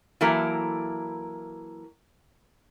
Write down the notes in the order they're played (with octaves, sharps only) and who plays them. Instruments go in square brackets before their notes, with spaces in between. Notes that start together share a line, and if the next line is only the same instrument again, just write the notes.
[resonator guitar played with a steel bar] E3 F#3 A#3 E4 A4 A#4